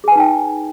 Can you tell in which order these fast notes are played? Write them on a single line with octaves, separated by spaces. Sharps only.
G#4 G#5 B4 D#4 G5